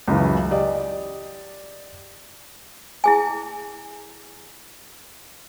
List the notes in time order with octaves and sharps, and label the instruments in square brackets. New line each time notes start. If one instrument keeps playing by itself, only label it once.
[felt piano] C#2 F#2 C#3 E3
G4 D5 D#5
[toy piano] E4 G#4 G#5